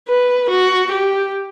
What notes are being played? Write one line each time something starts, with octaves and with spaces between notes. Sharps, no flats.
B4
F#4
G4